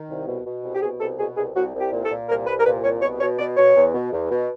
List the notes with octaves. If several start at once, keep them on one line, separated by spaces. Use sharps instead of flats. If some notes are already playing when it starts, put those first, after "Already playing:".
Already playing: D#3
C2
B2
B2
C2
G4
B2 G#4
C2 A4
B2 G#4
C2 G#4
C2 F#4
C2
G4
A#2
A4
A#2
C2 A#4
C2 B4
A#4
A#2 B4
C2 C#5
B2 C#5
B2 C#5
B2 D5
B2 C#5
E2
B2
E2
B2